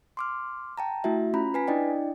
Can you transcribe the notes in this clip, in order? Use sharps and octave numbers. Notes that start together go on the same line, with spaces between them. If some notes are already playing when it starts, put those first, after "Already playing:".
C6 D6 F6
G5 A5 A#5
A3 E4 F#4 E5
C#4 F4 A#5 B5
B4 G#5 B6
D4 E4 D5 D#5 G5